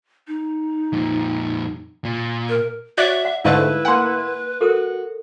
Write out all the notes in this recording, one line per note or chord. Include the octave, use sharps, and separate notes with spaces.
D#4
F2 A#2
A#2
A#4
F#4 C#5 D5 E5 F#6
F#5
G#2 D3 A3 E4 B4 F5
A#3 F#5 G#5 C6
F#4 A4 A#4 D#6